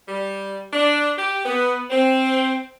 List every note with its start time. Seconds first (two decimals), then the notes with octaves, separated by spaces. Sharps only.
0.08 G3
0.72 D4
1.18 G4
1.45 B3
1.90 C4